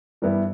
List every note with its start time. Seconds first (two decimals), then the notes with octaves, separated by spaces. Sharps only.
0.22 G2 E3 G3 B3 E4